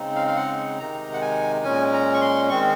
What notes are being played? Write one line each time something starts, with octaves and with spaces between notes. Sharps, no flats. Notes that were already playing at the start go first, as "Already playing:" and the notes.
Already playing: C#3 G#3 C4 D#4
F5
F5
F#5
C3 D#3 G#3 D#4 A#5
F#5
G#5
A#2 G#3 C#4 G#5
A#5
C#6
C6
D#3 G#3 C4 C#6